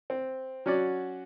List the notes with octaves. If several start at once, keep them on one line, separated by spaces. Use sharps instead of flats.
C4
F#3 C#4 F#4 D5